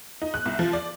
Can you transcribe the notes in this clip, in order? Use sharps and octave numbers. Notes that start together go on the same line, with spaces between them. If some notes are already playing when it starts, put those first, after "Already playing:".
D#4
F#6
C2
F3
D5